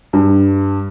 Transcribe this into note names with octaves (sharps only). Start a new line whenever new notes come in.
G2